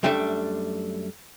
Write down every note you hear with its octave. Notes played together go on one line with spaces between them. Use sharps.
F#2 G3 A3 D4 A#4 E5